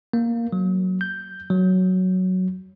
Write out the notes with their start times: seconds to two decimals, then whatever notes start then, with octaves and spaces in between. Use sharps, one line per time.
0.13 A#3
0.53 F#3
1.01 G6
1.50 F#3